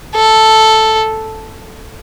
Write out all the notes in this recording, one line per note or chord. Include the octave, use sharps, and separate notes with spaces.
A4